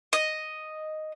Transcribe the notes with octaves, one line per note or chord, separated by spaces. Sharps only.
D#5